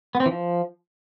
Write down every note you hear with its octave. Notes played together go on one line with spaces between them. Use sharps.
B3
C4
E3
F3